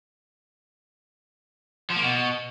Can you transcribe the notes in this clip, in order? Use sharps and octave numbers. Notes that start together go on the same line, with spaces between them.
F3
A#3
B2